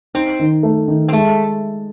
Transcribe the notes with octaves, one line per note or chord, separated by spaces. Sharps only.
C4 D#4
D#3
A3
D#3
C4
G#3 A3